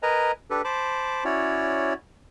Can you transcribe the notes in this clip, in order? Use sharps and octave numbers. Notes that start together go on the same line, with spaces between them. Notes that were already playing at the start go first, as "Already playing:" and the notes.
A#4 B4 D#5 G#5 A#5
D4 G4 A4 B4
C5 A5 B5 D6
C#4 E4 F#4 C#5 D5